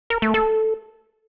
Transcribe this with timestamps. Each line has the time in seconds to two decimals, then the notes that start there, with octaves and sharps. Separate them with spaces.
0.10 A#4
0.22 A3
0.34 A4